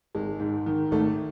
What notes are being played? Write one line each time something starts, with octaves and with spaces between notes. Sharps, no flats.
G#1 G#3
G#2
D#3
G#1 A3